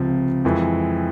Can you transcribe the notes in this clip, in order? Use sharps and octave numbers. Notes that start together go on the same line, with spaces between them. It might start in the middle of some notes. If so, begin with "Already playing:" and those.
Already playing: C#2 C3 F3
F2 E3 G#3